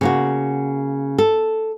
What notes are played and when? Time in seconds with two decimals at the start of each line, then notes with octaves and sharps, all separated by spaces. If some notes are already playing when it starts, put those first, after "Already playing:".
0.01 C#3 A#3 F#4
1.18 A4